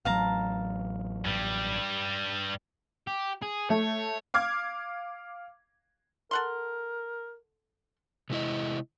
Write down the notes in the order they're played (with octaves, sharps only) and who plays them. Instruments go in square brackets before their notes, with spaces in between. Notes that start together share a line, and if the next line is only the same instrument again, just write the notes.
[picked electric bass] A1 F#3 [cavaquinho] F5 A5 A#5
[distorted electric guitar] G2 G3
G4
G#4
[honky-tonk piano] A3 [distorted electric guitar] C#5
[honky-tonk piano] F5 D6 F6 G#6
[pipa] A4 F#5 C6 [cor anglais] A#4
[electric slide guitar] C3 G#3 E4 D#5